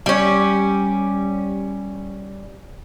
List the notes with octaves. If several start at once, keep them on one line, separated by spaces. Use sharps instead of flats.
G3 C#4